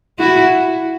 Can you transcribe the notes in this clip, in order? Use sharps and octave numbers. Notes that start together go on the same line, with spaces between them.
E4 F#4